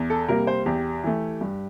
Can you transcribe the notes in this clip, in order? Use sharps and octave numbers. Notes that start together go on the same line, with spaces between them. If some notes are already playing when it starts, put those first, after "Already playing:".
Already playing: E2
A4
C3 G3 A#3 A#4
C5
E2 G4
E3 A3
G2